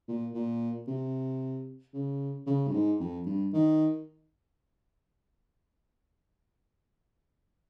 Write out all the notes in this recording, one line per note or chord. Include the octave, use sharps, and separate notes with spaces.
A#2
A#2
C3
C#3
C#3
G2
G#2
F2
G2
D#3